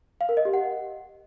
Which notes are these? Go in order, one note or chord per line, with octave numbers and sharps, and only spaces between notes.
F5
A#4
D#5
G4
F#5